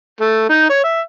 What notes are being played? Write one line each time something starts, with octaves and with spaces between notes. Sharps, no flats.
A3
D#4
C#5
E5